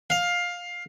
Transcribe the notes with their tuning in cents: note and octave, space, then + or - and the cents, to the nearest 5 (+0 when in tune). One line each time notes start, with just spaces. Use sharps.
F5 +15